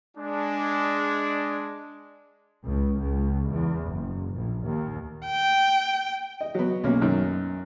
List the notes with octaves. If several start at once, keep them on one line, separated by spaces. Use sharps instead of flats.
G#3 D4
C#2
C#2
E2
F#1
A#1
D#2
G5
D#5
F#3 B3
B1 A#3 C#4
F#2 D#3